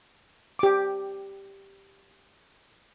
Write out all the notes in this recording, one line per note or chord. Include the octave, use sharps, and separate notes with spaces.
G4 D6